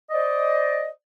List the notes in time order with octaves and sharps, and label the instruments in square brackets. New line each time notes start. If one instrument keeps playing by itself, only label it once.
[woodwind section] C5 D5 D#5